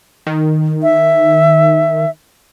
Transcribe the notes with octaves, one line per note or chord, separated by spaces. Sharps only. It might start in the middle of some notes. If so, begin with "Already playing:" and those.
D#3
E5